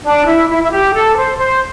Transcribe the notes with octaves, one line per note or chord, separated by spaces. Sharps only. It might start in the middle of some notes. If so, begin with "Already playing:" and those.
D4
E4
E4
E4
G4
A4
C5
C5